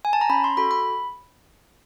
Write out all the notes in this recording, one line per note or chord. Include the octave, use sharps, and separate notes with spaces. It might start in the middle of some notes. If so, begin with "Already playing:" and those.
G#5
A5
A#5
C#4 B5
C6
F#4 A4 B5
B5